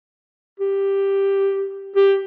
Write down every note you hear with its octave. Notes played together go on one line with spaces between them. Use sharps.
G4
G4